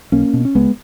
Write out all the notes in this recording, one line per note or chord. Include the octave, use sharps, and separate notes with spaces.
B1 A#3 C#4
B2
C#4
C#2 G#3 B3